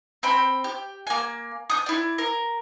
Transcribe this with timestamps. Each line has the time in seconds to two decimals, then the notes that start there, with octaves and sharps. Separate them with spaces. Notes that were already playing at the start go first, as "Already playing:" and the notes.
0.23 C4 G5 B5
0.64 G4
1.07 A#3 G#5
1.70 D#6 G6
1.86 E4 D5
2.18 A#4